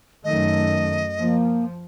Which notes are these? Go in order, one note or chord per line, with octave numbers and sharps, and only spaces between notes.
F#2 D#3 A3 D#5
F3 A#3